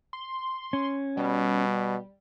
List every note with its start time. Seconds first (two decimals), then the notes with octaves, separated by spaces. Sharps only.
0.13 C6
0.73 C#4
1.17 B2 G3